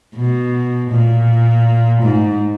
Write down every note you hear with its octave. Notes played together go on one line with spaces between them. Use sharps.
B2
A#2
G#2